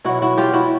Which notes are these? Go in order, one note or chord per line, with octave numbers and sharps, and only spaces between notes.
B2 F#3 E4 F#4
E4 F#4
F4 G4
E4 F#4